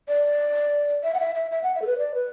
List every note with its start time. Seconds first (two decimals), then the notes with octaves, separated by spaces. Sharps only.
0.08 D5
1.04 E5
1.14 F#5
1.20 E5
1.35 E5
1.51 E5
1.63 F#5
1.75 E5
1.82 A4
1.87 B4
1.98 D5
2.15 B4